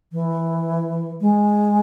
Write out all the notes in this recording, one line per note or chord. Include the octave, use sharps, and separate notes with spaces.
E3
G#3